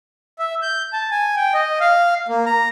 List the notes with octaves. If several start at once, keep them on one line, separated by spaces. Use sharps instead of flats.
E5
G6
A5
G#5
G5
D#5
F5
A#3
A#5